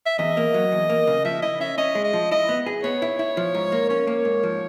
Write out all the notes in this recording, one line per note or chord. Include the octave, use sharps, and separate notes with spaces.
E5
E2 D#5
A#3
F#3
E2
A#3
C#3
F3 E5
E4 D#5
C#4 E5
C#4 D#5
G#3
D#5
F3
E4 D#5
B3
G#4
B3 C#5
E4
E4
F3
G#2
A#3
C#4 C#5
A#3
G#2
F3